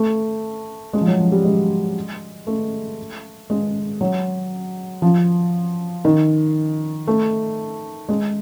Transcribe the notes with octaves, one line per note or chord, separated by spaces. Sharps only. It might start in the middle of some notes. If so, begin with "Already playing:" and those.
Already playing: A3
G#3
F3
F#3
F3
G3
G#3
A3
G#3
F#3
F3
D#3
A3
G#3